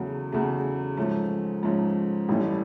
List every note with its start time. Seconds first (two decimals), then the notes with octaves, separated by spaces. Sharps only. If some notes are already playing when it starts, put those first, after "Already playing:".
Already playing: E2 C#3 F#3 A3
0.32 E2 C#3 F#3 A3
0.97 G#2 F3 A3 C#4
1.63 G#2 F3 A3 C#4
2.29 A1 G2 E3 A3 C#4